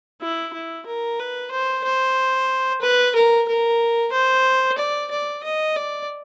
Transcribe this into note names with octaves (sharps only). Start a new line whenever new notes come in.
E4
E4
A#4
B4
C5
C5
B4
A#4
A#4
C5
D5
D5
D#5
D5